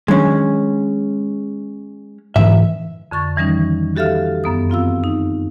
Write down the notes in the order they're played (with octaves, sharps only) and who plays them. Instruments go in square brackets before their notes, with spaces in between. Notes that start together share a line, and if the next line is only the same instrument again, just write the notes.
[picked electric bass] D#3 F#3 D4 [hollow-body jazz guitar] G#3 C#4
[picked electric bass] G#2 D3 E3 [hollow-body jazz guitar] E5
[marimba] F2 D3 C#6 A6
D#3 E3 G3 C#4 D#4
F#4 G4 A4 E5 F5 F6
F#2 B3 D#6
C4 F4 F5 E6
D#4